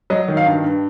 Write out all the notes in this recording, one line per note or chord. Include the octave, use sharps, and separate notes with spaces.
F#3 D#5
D#3
F5
G2
G2